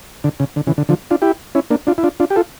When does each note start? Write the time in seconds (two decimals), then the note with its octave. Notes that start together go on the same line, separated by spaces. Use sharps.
0.24 D3
0.40 C#3
0.56 D3
0.67 C#3 E3
0.78 D3
0.89 D3 F3
1.11 D4 F4
1.22 E4 G4
1.55 C#4 E4
1.70 A#3 D4
1.87 D4 F4
1.98 E4
2.03 D4 F4
2.20 D4 F4
2.30 G4
2.36 F4 A4